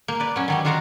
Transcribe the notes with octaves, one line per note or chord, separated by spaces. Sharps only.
A#3
B4 D5
F#3 C#4
D#3 F#3 G3
D#3 F4 F#4 A#4 F5 A#5